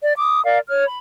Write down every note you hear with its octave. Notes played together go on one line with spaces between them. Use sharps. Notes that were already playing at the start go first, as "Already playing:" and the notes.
D5
D6 D#6
A#4 D5 F5
C#5 F6
B5